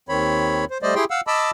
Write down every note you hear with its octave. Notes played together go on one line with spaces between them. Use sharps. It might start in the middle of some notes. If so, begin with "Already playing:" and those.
D#2 D#3 C4 C#5 B5
C5
G3 A3 C5 D5 D#5
E4 G4 G#4 G5 C6
F5 F#5 E6
D#5 A5 B5 D6 E6